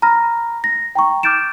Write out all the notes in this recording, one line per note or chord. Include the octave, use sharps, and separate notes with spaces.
A#5 B5 F6 A#6
A#6
G5 A#5 C#6
D6 F6 G6 A6 D7 E7